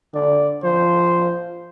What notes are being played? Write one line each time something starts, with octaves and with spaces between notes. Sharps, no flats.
D3 D5
F3 C5